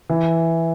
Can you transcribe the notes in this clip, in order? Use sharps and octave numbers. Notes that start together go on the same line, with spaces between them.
E3